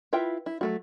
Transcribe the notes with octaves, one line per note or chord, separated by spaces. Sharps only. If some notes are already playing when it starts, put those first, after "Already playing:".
E4 F4 B4 E5 G5
E4
F#3 A3 F#4